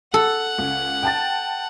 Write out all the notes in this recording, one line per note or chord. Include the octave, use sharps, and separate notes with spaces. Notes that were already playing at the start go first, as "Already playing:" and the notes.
A4 F#5
C#2
G5 A5 A6